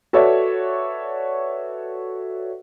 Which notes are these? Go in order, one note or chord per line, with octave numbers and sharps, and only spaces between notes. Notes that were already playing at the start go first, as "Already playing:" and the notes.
F#4 A4 B4 C#5 D5 E5